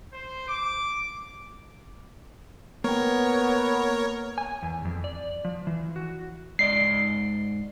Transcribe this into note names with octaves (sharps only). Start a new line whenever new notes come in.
C5
D6
A#3 B3 A#4 C#5 G5
G#5
E2
F2
D5
F3
E3
F#4
G#2 D5 D#5 C7